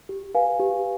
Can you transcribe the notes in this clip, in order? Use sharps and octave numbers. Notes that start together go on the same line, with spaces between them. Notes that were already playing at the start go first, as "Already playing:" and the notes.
G4
B4 F5 G#5
G4